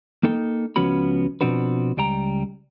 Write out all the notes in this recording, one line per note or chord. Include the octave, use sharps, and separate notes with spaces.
A#3 D#4 A4 G5
C#2 F3 B3 C#4 F#4 B5
B2 F3 C4 D4 F#4 B4
C#2 G3 G5 A#5